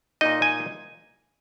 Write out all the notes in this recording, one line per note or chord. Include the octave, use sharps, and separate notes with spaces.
A#2 A#3 D#4 D#5
G#5